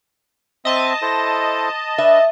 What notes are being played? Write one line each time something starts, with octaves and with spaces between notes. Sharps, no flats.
C4 D#5 E5 A5
E4 A4 C5
D4 B4 E5